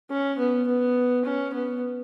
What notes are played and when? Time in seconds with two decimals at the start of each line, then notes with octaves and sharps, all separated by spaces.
0.10 C#4
0.38 B3
0.67 B3
1.25 C#4
1.53 B3